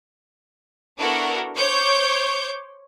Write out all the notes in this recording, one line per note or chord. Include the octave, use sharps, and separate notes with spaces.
B3 D4 E4 F#4 A4 A#4
C5 C#5 C#6 D6 G6